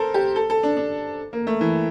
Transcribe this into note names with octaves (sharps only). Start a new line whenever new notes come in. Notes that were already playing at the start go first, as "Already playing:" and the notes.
Already playing: A4 A#4 C5
G4
A4
A4
D4
D4
A#3
A3
E3